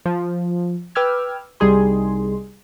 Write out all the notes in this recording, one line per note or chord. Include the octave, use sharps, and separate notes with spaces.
F3
B4 G5 D6 E6 F6 G#6
C2 G3 D#4 G#4 C6